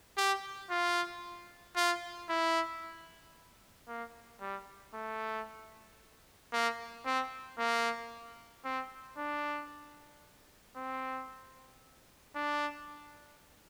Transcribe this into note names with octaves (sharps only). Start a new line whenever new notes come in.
G4
F4
F4
E4
A#3
G3
A3
A#3
C4
A#3
C4
D4
C4
D4